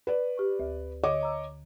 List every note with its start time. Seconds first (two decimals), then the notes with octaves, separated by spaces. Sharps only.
0.07 B4 D5
0.37 G4 C#6
0.60 D2
1.03 D3 C#5 D#5 D6
1.23 A#5 E6